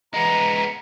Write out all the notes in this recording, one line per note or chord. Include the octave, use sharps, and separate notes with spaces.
G#3 B3 A#5